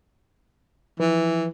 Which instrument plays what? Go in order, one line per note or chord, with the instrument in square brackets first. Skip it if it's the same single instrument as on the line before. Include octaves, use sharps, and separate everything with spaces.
[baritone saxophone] E3 [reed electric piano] F3 B4